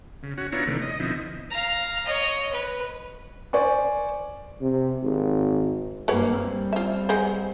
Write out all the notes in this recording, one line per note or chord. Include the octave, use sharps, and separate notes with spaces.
C#3
C#4 F#4
B3 D4 E4 F4 C#5 A#5
C3 D#3 E3 A3 B3 D4
D#5
B2 D3 F3 C4 D#4 E4
F5 A#5
C#5 D#5
B4
C5 D5 G#5 C#6
C3
G#1
G2 A#3 F#4 B4 C#5
G3 C4
F4 E5
G#3 B3 C5